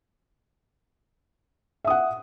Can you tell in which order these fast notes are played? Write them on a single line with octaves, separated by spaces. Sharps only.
E5 D#6 F#5